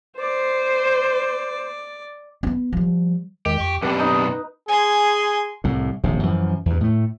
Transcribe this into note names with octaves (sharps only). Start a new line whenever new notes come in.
C5 D5
B3 C4
F3 G3
E2 D#3 G#3 G4
F2 C#6
F#2 B2 C4 D4 G4 B4
D#4
G#4 G#5 C6
C2 A2
D#1 A#1 C3
F#2 E3 F3
E2 G2
A2 A3